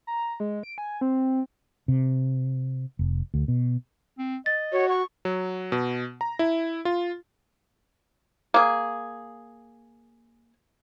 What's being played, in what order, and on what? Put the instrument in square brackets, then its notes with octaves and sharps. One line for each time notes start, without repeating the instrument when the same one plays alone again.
[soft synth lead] A#5
G#3
D7
G#5
C4
[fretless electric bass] C3
F1
D2
B2
[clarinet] C4
[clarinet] D#5 [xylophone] A6
[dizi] F#4 [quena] C#5
[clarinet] F#5 [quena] C#6
[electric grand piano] F#3
B2
A#5
E4
F4
[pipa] A#3 G#4